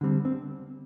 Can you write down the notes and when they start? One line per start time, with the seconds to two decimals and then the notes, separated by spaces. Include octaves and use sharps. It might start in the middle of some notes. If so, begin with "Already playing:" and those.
0.01 D3 G3 C4
0.25 C4